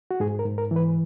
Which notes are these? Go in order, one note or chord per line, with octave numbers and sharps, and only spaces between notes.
F#4
G#2 G#4
A#4
G#2
A#4
E3
B4